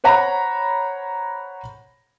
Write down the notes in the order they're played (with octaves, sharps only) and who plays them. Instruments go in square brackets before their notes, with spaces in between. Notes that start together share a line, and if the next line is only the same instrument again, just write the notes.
[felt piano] C5 C#5 F#5 A#5 B5